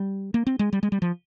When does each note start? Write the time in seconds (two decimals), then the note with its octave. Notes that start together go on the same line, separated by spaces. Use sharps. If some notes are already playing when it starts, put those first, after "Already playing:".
Already playing: G3
0.34 A#3
0.47 C4
0.59 G#3
0.73 G3
0.83 G#3
0.92 G3
1.02 F3